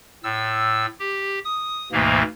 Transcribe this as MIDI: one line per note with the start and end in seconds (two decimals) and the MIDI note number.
0.24 0.86 45
0.24 0.86 88
1.00 1.39 67
1.45 1.89 87
1.92 2.23 38
1.92 2.23 44
1.92 2.23 47
1.92 2.23 52
1.92 2.23 58